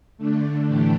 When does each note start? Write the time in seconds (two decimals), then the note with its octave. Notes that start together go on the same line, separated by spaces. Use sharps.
0.18 D3 A3 D4
0.67 A2 E3 A3 D4 G4